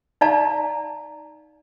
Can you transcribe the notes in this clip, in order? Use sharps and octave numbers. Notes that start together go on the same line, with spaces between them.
D#4 D5 F5 A5 A#5